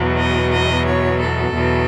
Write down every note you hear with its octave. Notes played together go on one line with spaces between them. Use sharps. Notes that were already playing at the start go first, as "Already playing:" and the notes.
Already playing: E2 B2 F#3
D#5
D#5
C#5
A4
E2 B2 F#3